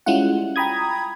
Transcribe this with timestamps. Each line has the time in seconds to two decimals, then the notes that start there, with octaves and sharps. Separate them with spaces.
0.06 G3 G#3 C#4 E4 F4 F#5
0.56 G5 A#5 B5 D#6 G#6